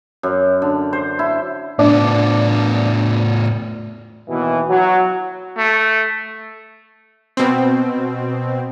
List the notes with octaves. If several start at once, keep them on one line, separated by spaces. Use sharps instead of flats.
F#2
D3
C5
E4
A2 B3 D4
D#2 B2 E3
F#3
A3
B2 C4